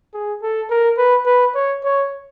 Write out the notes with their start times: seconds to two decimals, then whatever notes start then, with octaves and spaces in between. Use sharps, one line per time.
0.14 G#4
0.42 A4
0.70 A#4
0.98 B4
1.26 B4
1.55 C#5
1.84 C#5